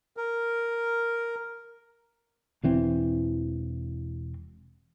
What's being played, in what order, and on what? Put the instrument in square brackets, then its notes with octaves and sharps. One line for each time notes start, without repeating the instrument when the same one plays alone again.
[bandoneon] A#4
[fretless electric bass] E1 E3 C4